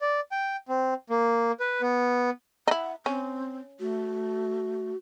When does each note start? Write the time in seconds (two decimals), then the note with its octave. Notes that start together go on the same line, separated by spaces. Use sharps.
0.01 D5
0.31 G5
0.69 C4
1.10 A#3
1.60 B4
1.81 B3
2.68 D#4 E4 F#5
3.06 C4 C#4
3.80 A3 F#4